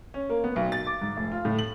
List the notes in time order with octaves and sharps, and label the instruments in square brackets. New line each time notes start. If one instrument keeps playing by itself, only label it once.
[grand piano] C#4
A#3
B3
B1
A6
D6
G#2
F1
F4
A2
F#7